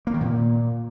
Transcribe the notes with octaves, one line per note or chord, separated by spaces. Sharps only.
A#3
D#3
A#2